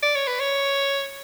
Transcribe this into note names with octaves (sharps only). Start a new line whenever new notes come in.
D5
C#5
B4
C#5